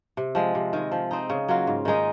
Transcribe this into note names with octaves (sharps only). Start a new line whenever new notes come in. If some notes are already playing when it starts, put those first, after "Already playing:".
C3
F3 G#3
C3
D#3 G#3
F3
C4 D#4
C#3
F#3 A#3 F4
G#2
D#3 G#3 D#4